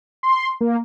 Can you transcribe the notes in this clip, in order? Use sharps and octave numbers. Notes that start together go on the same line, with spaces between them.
C6
A#3